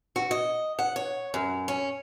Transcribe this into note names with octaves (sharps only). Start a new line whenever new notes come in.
F#4
D#5
F#5
C#5
F#2
C#4